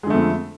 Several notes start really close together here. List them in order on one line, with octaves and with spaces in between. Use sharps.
G#3 D3 A3 F2